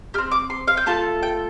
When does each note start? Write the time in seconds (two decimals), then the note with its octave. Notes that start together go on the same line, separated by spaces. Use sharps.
0.14 G4 F6
0.18 C4
0.32 D6
0.50 C6
0.68 F5
0.77 G5
0.86 A3 F4 A4 A5
1.23 G5